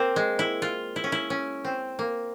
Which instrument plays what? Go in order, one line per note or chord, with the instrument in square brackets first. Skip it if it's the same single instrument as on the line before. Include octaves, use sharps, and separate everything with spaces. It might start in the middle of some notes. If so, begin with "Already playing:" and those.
Already playing: [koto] A#3 C4
G#3
E4
F4
E4
C#4
E4
C#4
C4
A#3